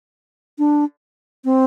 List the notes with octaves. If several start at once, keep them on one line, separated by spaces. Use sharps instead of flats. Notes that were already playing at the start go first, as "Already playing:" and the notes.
D4
C4